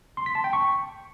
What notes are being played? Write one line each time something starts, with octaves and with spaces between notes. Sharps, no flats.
C6
B6
A5
G5
C#6